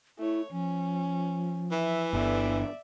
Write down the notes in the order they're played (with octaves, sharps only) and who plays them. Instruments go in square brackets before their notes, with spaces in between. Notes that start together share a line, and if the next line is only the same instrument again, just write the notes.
[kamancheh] A3 C#5 [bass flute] E4
[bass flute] F3 [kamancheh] C#4
[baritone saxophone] E3 [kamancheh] E5
[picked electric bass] G1 [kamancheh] D5 E5